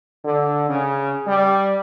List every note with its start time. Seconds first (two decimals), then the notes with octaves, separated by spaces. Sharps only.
0.24 D3
0.70 C#3
1.27 G3